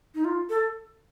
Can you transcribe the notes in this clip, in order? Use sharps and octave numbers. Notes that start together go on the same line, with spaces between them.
D#4
F4
A4